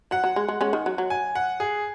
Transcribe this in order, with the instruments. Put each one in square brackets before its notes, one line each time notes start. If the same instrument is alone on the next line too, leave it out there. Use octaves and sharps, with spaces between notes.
[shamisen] F#3 [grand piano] F#5
[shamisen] F#3
G#3
G#3
G#3 C#4
D#3
F#3
F#3
[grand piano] G#5
F#5
G#4